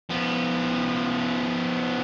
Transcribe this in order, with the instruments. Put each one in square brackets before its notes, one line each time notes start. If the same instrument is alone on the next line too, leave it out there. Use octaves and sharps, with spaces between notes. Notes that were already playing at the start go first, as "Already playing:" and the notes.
[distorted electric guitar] F3 B3